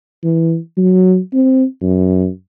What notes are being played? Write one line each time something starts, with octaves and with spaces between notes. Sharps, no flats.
E3
F#3
C4
F#2